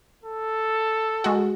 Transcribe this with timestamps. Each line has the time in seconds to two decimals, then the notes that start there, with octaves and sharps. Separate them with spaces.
0.24 A4
1.24 G#3 F#4